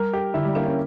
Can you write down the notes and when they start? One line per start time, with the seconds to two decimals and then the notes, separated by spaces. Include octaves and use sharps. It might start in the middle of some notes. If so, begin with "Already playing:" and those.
Already playing: G3 A#4
0.13 G4 A4
0.34 D3 E4
0.45 G3
0.55 A#3 D4
0.66 C#4